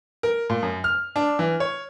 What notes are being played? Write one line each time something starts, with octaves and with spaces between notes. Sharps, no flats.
A#4
A#2
F#2
F6
D4
E3
C#5